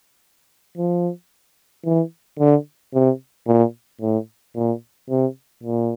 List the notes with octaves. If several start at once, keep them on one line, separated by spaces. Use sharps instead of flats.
F3
E3
D3
C3
A#2
A2
A#2
C3
A#2